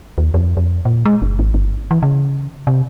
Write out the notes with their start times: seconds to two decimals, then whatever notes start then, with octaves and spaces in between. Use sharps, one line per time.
0.18 D#2
0.34 F2
0.57 F2
0.85 A#2
1.05 G#3
1.22 F#1
1.39 G#1
1.54 G1
1.91 E3
2.03 C#3
2.67 C3